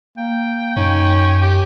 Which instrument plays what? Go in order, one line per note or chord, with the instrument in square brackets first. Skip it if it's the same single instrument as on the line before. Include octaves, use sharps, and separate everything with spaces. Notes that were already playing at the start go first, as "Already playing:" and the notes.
[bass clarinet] A#3 [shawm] G5
[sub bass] F#2 [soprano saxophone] C#4 [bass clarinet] D#4
[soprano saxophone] G4